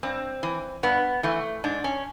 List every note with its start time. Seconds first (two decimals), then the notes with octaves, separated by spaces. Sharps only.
0.03 G2 C4
0.43 E3
0.83 G2 B3
1.23 E3 A3
1.64 G#2 D4
1.84 C#4